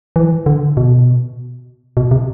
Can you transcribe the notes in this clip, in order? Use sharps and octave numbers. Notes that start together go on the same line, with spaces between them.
E3
D3
B2
B2
C3